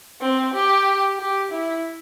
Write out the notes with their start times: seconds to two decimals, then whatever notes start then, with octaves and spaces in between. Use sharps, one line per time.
0.21 C4
0.54 G4
1.19 G4
1.52 E4